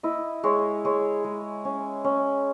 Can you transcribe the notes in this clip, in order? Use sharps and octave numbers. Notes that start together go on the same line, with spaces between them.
E4 D#5
G#3 C#5
G#3 C#5
G#3
C#4
C#4